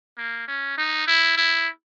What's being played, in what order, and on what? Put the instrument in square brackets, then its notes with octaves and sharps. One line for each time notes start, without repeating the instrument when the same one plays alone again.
[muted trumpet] A#3
C#4
D#4
E4
E4